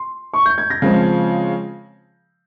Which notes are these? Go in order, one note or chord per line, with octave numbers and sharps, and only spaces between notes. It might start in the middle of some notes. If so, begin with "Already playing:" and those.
Already playing: C6
C#6
G6
G#6
A#6
C#3 F3 G#3 C4